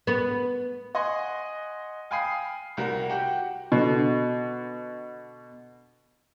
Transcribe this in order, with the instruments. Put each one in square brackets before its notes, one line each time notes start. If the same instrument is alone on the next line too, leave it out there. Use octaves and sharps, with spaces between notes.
[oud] B3
[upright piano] D#5 F#5 G#5 C6 C#6
F5 G5 G#5 B5 D#6 C7
C2 G3 F#4 A#4
F#4 G4 F#5 G5
[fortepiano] B2 D3